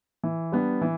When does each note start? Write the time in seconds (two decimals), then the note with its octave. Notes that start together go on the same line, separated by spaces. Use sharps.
0.24 E3
0.52 G3 B3 D4
0.81 E3